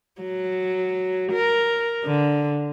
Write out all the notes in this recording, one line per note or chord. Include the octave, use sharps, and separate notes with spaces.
F#3
A#4
D3